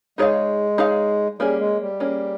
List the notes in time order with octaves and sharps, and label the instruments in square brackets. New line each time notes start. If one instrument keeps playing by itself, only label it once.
[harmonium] G#3 [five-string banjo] D#4 G#4 C#5 F5
[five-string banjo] D#4 G#4 C#5 F5
[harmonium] G3 [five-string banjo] A#3 C#4 G#4
[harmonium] G#3
G3
[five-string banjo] A#3 C#4 G#4